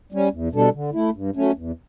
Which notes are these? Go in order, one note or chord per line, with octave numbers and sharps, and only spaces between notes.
G3 C#4
E2
B2 G3 D4 A4
D3
A3 E4
G2
F#3 A3 C#4
E2